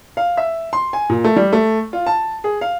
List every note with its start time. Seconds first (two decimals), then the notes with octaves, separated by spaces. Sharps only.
0.17 F5
0.37 E5
0.73 C6
0.93 G#5
1.10 A#2
1.24 A3
1.36 G3
1.53 A3
1.93 F4
2.07 A5
2.44 G#4
2.61 F5